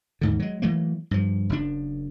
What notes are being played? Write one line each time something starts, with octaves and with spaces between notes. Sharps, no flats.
D#2 G#2 D3
F#3 G#3
E3 F#3 A3 A#3
G2 F3
F#1 F#2 D4